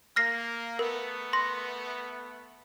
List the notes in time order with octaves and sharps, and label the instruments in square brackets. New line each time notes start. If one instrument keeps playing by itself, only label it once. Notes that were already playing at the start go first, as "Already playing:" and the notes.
[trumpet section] A#3 [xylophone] F6 A#6 C7
[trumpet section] A3 B3 [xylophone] A#4
[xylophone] C6 A#6